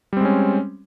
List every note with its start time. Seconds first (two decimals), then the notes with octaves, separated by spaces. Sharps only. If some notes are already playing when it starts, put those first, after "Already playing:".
0.13 G3
0.17 C4
0.21 G#3
0.25 C#4